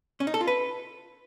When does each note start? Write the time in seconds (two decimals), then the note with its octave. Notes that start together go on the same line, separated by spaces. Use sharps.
0.20 C#4
0.27 D#4
0.34 A4
0.41 F4
0.47 B4